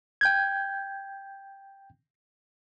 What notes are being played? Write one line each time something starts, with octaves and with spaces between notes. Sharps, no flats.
G5 G6 G#6